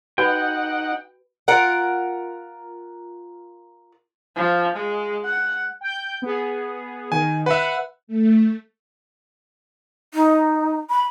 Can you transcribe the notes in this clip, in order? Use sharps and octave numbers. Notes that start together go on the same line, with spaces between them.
D#4 F#4 B4 F#5 G5 B5
F4 A#4 F#5
F3
G#3
F#5
G5 G6
B3 G#4
D#3 G#5
B4 E5 F#5
A3
D#4
B5